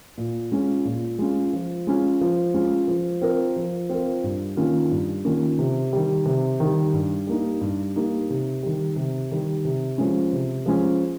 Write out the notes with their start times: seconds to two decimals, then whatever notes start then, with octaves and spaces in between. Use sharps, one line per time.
0.18 A#2
0.52 G#3 C#4 F4
0.85 A#2
1.19 G#3 C#4 F4
1.53 F3
1.87 G#3 C#4 F4
2.21 F3
2.54 G#3 C#4 F4
2.88 F3
3.22 C4 F4 A#4
3.56 F3
3.90 C4 F4 A#4
4.24 G2
4.57 D#3 A#3 C#4 F4
4.91 G2
5.25 D#3 A#3 C#4 F4
5.59 C3
5.93 D#3 G3
6.26 C3
6.60 D#3 G3
6.93 G2
7.27 G3 A#3 D#4
7.61 G2
7.96 G3 A#3 D#4
8.30 C3
8.63 D#3 G3
8.96 C3
9.31 D#3 G3
9.65 C3
9.98 F3 G#3 C#4
10.33 C3
10.66 F3 G#3 C#4